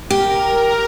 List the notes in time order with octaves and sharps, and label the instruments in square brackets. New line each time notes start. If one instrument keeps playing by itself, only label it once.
[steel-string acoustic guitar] G4 [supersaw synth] A#4